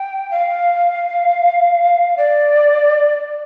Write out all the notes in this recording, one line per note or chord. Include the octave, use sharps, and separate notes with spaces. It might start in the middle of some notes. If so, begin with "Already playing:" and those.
Already playing: G5
F5
D5